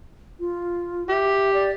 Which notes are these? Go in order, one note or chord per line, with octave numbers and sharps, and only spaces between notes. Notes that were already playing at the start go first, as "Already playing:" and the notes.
F4
G4 E5
D5